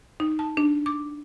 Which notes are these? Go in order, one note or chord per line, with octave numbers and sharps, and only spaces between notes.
D#4
A5
D4
D6